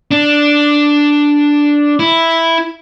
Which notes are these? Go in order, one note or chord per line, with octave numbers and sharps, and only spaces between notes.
D4
E4